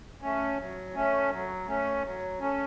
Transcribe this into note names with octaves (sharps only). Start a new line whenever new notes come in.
A3 C#4
F#3
A3 C#4
F#3
A3 C#4
F#3
A3 C#4